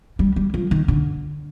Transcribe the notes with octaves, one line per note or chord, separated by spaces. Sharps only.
G3
G3
F3
D#3
D3